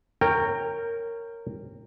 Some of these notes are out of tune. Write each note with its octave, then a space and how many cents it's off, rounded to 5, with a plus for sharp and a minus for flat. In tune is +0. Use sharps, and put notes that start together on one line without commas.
A#4 -15 C#5 -5 G5 +15